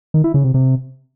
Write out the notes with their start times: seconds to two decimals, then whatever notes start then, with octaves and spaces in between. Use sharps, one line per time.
0.14 D#3
0.24 E4
0.34 C#3
0.44 C3
0.54 C3